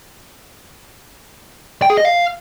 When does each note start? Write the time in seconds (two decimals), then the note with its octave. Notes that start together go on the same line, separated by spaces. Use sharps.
1.82 G5
1.90 G#4
1.97 D#5
2.05 F5